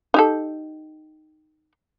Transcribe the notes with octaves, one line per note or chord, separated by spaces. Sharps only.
D#4 G4 A4